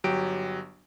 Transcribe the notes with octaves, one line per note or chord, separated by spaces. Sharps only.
G1 F#3 G4 D7